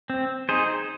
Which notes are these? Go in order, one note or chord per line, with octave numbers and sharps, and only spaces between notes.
C4
D#4 G#4 C5